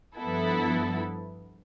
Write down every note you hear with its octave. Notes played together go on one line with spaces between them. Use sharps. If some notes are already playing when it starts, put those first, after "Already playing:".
G2 F3 B3 E4 A4